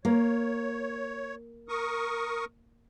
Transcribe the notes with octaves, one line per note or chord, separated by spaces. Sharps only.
A#3 C#5
A#4 C#6 D#6